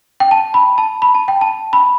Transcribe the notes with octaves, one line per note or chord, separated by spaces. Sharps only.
G5
A5
B5
A5
B5
A5
G5
A5
B5